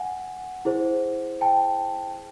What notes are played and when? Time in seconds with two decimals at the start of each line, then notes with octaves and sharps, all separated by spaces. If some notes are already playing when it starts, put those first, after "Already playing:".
Already playing: F#5 G#5
0.65 E4 G#4 C5
1.41 G5 A5